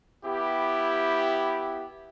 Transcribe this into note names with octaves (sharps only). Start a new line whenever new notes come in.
B3 E4 G4